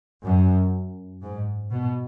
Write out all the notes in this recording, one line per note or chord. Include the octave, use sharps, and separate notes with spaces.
F#2
G#2
B2